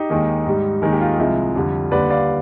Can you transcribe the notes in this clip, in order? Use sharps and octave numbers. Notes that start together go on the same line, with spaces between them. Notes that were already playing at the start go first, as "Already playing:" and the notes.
Already playing: D#4 G4
D#2 D#3 G#3
G#2 G3
D#2 D#3 G#3 D#4
G4
F4
C2 C3 F3 G#3
F2 D3 G3
D#2 D3 G3 B4 D5
D5 F5